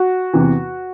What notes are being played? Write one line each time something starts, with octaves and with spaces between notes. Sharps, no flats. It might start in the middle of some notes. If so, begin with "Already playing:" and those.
Already playing: F#4
E2 C3 E3